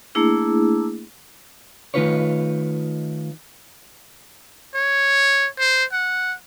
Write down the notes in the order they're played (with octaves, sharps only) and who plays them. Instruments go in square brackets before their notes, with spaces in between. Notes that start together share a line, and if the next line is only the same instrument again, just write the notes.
[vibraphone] A3 A#3 D4 E4 G#4
[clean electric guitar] D#3 A3 D#4 F4 B4 C#5
[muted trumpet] C#5
C5
F#5